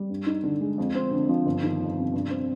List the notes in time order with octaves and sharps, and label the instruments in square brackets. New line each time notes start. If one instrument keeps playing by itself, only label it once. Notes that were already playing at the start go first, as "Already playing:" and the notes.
Already playing: [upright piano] G3
G2
D#4
D3
G#3
F2
C4
D3
F3
G1
D#3
F2
C3
G2
C4